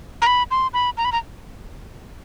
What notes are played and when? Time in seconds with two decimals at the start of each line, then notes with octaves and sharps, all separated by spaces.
0.22 A#5
0.27 B5
0.51 C6
0.74 B5
0.97 A#5
1.05 B5
1.12 A#5